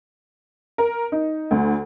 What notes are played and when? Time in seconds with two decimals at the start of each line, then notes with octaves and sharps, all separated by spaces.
0.78 A#4
1.12 D#4
1.51 D2